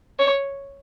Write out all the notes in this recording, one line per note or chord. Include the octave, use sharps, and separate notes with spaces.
C#5